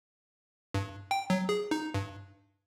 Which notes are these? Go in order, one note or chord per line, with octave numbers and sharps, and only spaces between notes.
G2
G5
F#3
G#4
D#4
G2